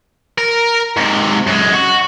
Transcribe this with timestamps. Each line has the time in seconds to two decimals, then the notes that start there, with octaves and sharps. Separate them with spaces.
0.38 A#4
0.97 G#2 C3
1.47 F#2 G#3
1.74 F#4